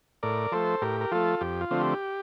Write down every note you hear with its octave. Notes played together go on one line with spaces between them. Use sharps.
A2 A#4 D5
F3 A3 A4 C5
A2 G4 A#4
A#4
F3 A3 F4 A4
F2 G4
F4
D3 F3 A3 C4
G4